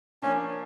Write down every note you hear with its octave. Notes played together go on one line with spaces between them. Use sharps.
F3 A#3 C#4 D4